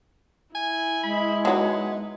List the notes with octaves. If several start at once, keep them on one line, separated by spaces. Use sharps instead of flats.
E4 G#5
G#3 B5
D#3 F#3 B3